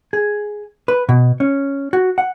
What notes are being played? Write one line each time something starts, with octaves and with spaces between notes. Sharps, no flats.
G#4
B4
B2
C#4
F#4
F#5